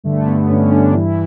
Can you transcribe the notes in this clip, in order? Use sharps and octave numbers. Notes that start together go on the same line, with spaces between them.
G2 D3 A3
B3
G2 D3 C#4
D4
D4
G2 E3 E4